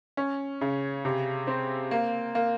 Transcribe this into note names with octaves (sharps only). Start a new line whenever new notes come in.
C#4
C#3
C3
C4
A#3
A#3